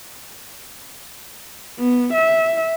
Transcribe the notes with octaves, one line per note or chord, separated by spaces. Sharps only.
B3
E5